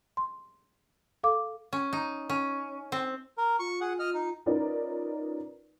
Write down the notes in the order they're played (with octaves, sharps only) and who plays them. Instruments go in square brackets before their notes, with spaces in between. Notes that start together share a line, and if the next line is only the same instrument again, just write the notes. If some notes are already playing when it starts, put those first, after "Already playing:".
[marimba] C6
A4 F5 D6
[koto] C#4
D#4
C#4
C4
[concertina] A#4
[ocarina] F4 [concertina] C#6
[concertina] G#4 F#5
D#5 F6
D#4
[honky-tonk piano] C#4 D#4 F4 A#4 B4 D5